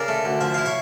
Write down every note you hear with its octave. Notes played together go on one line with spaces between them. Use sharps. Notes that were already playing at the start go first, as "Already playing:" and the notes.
Already playing: C#3 A#4 D5
A3
D2
F3 E5
E4 F5
C#5 E5